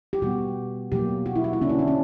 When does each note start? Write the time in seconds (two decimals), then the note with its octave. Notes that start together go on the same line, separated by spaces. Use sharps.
0.13 G4
0.22 B2 G3 B3 F#4
0.92 B2 F#3 A#3 G4
1.26 F#4
1.36 E4
1.44 F#4
1.53 E4
1.62 D3 A#3 C#4 D4
1.69 E4
1.79 D4
1.88 C#4